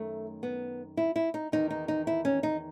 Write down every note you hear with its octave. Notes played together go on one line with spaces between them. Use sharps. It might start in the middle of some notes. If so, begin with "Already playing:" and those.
Already playing: F#2 D#3 A3
B3
E4
E4
D#4
E2 D#3 D#4
D#4
D#4
E4
C#4
D#4